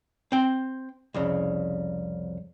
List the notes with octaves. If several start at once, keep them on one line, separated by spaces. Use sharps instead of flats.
C4 G5
C2 F2 C#3